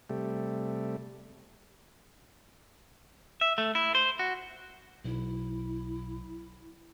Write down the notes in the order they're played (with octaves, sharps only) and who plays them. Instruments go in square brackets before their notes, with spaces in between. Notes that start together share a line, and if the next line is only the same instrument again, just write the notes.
[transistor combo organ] C3 G3 A3
[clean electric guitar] E5
A3
E4
C5
F#4
[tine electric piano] B1 [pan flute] E4